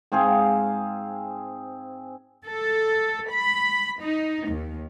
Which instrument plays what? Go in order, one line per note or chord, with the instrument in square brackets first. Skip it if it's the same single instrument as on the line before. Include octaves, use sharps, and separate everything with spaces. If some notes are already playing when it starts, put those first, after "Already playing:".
[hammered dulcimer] G#2 C4 G#4 F5
[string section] A4
B5
D#4
D#2